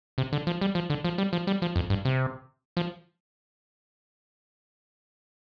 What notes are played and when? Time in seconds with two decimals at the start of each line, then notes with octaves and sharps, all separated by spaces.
0.18 C3
0.33 D3
0.47 F3
0.61 G3
0.75 F3
0.90 D3
1.04 F3
1.18 G3
1.33 F3
1.47 G3
1.62 F3
1.76 F2
1.90 G2
2.05 C3
2.77 F3